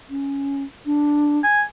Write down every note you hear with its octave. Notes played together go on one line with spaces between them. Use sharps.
C#4
D4
G#5